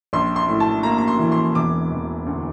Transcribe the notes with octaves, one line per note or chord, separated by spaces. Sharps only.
A#1 C6
C6
A2
A5
A#3 A#5
A#5
C6
E3
C6
E1 D6
E1
D2